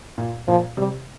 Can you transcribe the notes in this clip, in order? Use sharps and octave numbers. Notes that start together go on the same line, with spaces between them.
A#2
A#2 F3
C3 G3